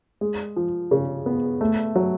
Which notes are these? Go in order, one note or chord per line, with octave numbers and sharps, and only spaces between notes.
G#3
F3
C#3
B3
A3
F#3